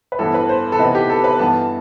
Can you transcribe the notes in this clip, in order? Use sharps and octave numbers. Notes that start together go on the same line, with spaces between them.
B4
G2 E3 B3 E4 A4
B4
C5
A4
C3 E3 B3 D#4 B4
G4
A4
B4
G2 E3 B3 A5